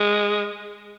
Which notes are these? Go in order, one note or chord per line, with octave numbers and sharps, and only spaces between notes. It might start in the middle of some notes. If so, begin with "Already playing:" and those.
Already playing: G#3